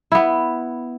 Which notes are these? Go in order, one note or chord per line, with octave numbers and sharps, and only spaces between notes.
B3 E4